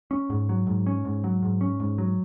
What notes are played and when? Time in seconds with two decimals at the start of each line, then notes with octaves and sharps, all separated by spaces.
0.11 C#4
0.30 G#2
0.49 F#3
0.67 G#2
0.86 C#4
1.05 G#2
1.24 F#3
1.42 G#2
1.61 C#4
1.80 G#2
1.98 F#3